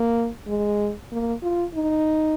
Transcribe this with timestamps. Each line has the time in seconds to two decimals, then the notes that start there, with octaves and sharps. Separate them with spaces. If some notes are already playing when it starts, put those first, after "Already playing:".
Already playing: A#3
0.48 G#3
1.12 A#3
1.43 F4
1.75 D#4